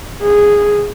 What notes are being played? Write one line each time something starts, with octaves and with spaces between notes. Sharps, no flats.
G#4